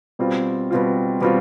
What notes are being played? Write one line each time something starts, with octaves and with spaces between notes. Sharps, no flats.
B2 G3 C4 F4
B2 G3 C4 F4
B2 G3 C4 F4